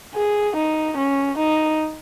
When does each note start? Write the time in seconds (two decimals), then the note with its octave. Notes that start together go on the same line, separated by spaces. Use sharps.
0.15 G#4
0.57 D#4
0.97 C#4
1.38 D#4